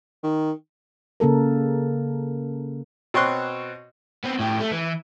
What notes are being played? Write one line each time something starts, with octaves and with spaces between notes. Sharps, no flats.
D#3
C#3 A#3 A4 A#4
B2 C4 C#5 C6 F#6
B3 C4
A2 G4
A3
E3